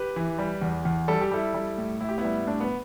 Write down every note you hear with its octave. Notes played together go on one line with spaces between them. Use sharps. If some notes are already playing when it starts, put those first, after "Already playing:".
Already playing: G4 B4
E3
G3
E2
E2
G3 A4
G4
G3 E4 A4
G3
A2
A2 E4
G4
B3 E4
G3
A2 D4
B3